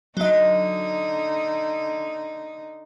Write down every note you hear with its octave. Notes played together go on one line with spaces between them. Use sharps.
D3 F#3 D#4 D#5